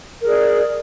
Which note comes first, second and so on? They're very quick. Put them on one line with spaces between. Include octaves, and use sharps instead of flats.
A#4 G#4 D5